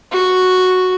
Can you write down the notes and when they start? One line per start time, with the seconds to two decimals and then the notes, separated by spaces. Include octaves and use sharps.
0.12 F#4 C#6